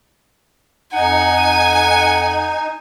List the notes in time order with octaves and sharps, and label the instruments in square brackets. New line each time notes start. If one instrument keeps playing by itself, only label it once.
[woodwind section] F2 F#5 [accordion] D#4 [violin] G#5